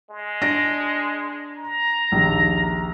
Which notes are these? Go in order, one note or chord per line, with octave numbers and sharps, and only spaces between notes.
G#3
D4 A#6 D7
A#5
A#1 D#2